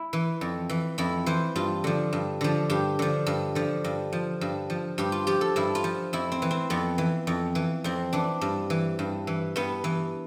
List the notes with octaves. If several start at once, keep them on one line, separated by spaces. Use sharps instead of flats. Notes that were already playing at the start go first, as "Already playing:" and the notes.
Already playing: E4
E3
F2
E3
F2 E4
E3 C5
G2 F4
D3 F3
G2
D3 F3
G2 G4
D3 F3
G2
D3 F3
G2
F3
G2
F3
G2 G4
F4
F3 G4
A4
G2 E4
F4
F3
F2 E4
C4
E3
C4
F2 B3
E3
F2
E3
F2 C4
E3 D4
G2
E3
G2
E3
G2 B3
E3